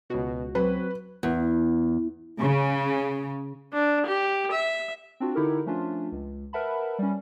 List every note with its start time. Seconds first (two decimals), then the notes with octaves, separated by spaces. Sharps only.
0.10 C#2 B2 F#4
0.55 F#3 C4 B4
1.23 E2
2.41 C#3
3.73 D4
4.06 G4
4.52 E5
5.20 C4 D4 F4 F#4
5.35 D3 D#4 E4 G4 A4 A#4
5.66 F3 A3 C#4 D4 F4
6.12 C#2
6.53 A#4 B4 E5 F#5 A5 B5
6.99 G3 C#4